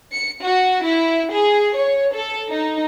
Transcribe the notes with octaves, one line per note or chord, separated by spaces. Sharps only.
C#7
F#4
E4
G#4
C#5
A4
D#4